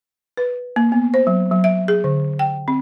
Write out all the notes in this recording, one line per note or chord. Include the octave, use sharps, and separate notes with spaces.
B4
A#3
B3
C5
F#3
F#3
E5
G#4
D3
G5
C4